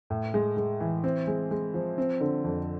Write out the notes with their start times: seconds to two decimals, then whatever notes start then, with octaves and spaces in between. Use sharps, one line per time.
0.10 A2
0.34 G#3
0.57 G#3
0.80 E3
1.04 C4
1.27 G#3
1.51 G#3
1.74 F3
1.98 C4
2.21 D3
2.44 F2